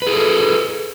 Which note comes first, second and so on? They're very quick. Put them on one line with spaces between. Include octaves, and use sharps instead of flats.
B4 G#4 A4